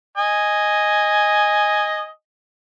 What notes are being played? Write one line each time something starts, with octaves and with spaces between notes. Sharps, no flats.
D#5 G#5